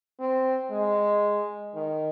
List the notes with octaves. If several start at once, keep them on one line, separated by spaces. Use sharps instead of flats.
C4
G#3
D#3